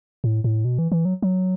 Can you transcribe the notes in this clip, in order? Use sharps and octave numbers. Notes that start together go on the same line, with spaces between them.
A2
A2
B2
E3
E3
F#3
F#3